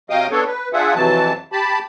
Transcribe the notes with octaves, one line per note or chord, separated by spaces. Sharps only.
C3 F#3 D#5 F5 G5 D#6
B3 D4 A4 C#5
B4
D4 F4 G#4 E5 F#5
F2 C3 E3 F#3 A5
G4 A5 B5